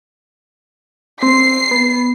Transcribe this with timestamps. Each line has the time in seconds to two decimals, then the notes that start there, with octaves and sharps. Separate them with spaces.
1.23 C4 C7
1.71 B3